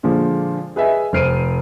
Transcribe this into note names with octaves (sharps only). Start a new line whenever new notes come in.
A#2 D3 F3 G#3
G#4 B4 D#5 E5 G#5
F1 C5 F6 C7 D7 D#7